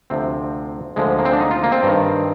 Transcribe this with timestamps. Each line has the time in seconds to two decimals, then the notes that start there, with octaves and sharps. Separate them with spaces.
0.10 D2 C3 F3 C4
0.96 D2 D3 F3 G#3
1.19 A#3
1.25 C4
1.33 D4
1.40 D#4
1.51 F4
1.64 A#3
1.72 C4
1.83 G2 D#3